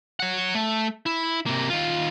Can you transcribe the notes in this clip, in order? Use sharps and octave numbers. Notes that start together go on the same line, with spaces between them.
C#5 F#5
A3
E4
C3 A#3
D#3 F4